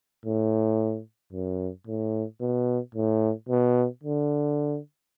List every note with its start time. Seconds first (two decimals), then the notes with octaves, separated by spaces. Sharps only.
0.25 A2
1.32 F#2
1.87 A2
2.41 B2
2.94 A2
3.48 B2
4.03 D3